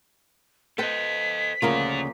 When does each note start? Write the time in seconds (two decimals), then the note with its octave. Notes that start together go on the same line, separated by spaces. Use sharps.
0.78 A4 B4 C5 D#5 G5 B6
1.62 D2 C#3 F3 A#3 F4 A#4